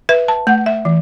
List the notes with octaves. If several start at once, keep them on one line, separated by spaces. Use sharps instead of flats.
B4 E5
A5
A3 F#5
E5
E3